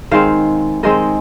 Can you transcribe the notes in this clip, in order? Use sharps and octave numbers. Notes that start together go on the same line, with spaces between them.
D#3 G#3 C4 F5
D#3 G#3 C4 D#5